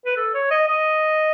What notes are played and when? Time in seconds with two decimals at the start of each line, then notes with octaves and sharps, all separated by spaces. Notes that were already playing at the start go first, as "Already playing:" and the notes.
0.06 B4
0.16 A4
0.34 C#5
0.51 D#5
0.68 D#5